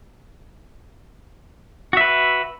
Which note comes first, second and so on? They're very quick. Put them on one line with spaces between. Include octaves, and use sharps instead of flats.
F#4 E5 B4